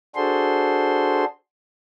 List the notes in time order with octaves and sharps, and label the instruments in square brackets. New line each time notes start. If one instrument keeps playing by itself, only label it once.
[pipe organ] D4 F#4 G#4 A4 C5 C6